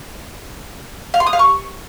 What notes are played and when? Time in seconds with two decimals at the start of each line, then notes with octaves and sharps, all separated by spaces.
1.14 F5
1.20 C6
1.27 D#6
1.33 F5
1.39 C#6